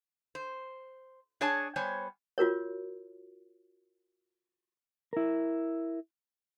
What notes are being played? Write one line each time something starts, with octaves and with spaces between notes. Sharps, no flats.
C5
D4 G#4 C#5 G#5 A5
G3 B3 C5 C#5 G#5
F4 F#4 A#4 C#5
E4 A#4